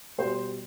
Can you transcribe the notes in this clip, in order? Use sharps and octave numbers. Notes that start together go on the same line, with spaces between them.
B2 G3 C5